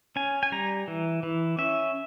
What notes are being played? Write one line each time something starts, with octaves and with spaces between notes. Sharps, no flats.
C#4 G#5
G#5
G3 A#5
E3
E3
C#4 E5